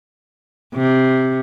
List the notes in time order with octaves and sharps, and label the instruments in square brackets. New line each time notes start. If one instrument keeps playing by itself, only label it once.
[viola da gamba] C3